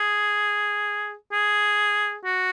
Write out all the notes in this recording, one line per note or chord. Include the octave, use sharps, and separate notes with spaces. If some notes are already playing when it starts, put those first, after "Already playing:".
Already playing: G#4
G#4
F#4